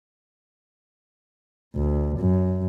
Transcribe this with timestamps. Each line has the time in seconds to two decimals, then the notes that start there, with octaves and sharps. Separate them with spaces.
1.75 D2
2.20 F#2